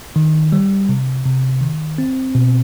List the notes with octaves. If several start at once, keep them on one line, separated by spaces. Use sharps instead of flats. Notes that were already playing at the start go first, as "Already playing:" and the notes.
D#3
G3
C3
C3
D#3
C4
B2